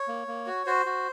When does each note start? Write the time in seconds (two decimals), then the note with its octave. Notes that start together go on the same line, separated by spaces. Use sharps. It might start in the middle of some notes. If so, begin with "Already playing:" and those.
Already playing: C#5
0.08 A#3
0.27 A#3
0.47 F#4
0.66 F#4 C5
0.86 F#4